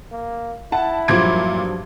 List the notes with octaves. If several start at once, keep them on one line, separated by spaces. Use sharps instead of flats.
A#3
E4 F#5 A5
G2 A#2 F3 F#3 G#6 D7